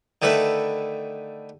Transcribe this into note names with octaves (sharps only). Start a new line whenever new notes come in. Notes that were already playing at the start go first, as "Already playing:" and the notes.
D3 D#3 A3 B4 E5